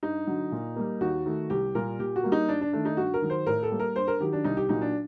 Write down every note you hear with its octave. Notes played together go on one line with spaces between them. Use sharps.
G2 D#4
D3 F#3
A#2
G3 A#3
D#2 F#4
D#3 A3
C2 G4
A#2 G3 A#3 A#4
A#2 G4
F#4
G3 A#3
D#4
G2 D4
D4
D#3 A3 D4
D#4
G2 F#4
A#4
D#3 F#3
C5
A2 A#4
A4
G3 A#3
A#4
G2 C5
A#4
D#3 F#3 G4
D4
C2 D#4
G4
A#2 F#3 D#4
D4